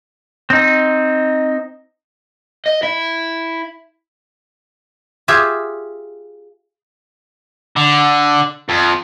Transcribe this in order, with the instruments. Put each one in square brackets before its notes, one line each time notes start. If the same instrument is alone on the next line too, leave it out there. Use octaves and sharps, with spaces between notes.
[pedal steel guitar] C4 D#4
[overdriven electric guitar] D#5
E4
[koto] F4 G4 G#4 E5
[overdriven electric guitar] D3
F2